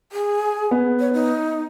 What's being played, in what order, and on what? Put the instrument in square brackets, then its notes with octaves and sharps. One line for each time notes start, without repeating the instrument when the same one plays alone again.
[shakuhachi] G#4
[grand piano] B3
[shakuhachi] C#5
D#4